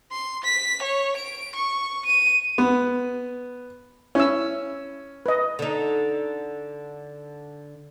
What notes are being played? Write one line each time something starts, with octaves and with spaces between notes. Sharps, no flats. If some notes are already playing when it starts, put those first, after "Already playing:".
C6
B6
C#5
D7
C#6
D#7
B3
C#4 E4 E6
B4 D#5
D3 D#4